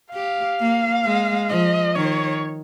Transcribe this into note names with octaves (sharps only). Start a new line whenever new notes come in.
G4 F5
A#3
G#3
F3 D#5
D#3 C#5